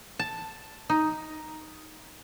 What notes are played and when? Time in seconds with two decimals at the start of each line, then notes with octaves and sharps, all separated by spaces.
0.19 A5
0.89 D#4